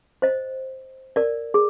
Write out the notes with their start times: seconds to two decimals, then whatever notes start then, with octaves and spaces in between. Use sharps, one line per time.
0.22 C5 D#5
1.16 A#4 D5
1.54 G#4